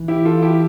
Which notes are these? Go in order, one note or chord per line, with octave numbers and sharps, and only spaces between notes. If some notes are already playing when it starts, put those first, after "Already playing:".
Already playing: E3
E4 G4
F4 A4
E4 G4